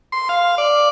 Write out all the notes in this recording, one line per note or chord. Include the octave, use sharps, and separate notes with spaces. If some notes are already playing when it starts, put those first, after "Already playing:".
C6
F5
D5